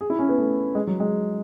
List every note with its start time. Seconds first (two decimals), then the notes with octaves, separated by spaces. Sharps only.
0.01 G#4
0.10 E4
0.19 C#4
0.29 B3
0.38 A3
0.75 G#3
0.87 F#3
1.00 G#3